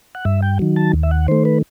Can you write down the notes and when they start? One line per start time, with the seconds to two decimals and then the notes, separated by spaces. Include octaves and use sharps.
0.15 F#5
0.25 G2 E5
0.43 G5
0.59 D#3 F#3
0.76 A5
0.94 D#2
1.03 E5
1.11 F#5
1.28 D#3 A3 C5
1.45 B4